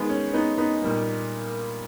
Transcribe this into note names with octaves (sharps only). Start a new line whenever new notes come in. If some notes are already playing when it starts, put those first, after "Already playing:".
Already playing: D#3 G#3 B3
C#4
B3 D#4
B3 D#4
A#2 G3 A#3